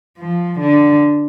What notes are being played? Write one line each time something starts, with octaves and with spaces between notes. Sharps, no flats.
F3
D3